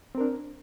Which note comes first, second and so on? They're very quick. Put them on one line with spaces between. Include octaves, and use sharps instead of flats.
C4 A#4 D4